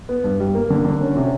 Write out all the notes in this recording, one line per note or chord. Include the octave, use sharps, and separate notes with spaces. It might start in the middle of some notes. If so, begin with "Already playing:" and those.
B3
G2
G3
A#3
D3
D3
C#4
C3